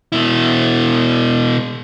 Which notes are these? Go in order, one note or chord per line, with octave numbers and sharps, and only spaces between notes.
B2 E4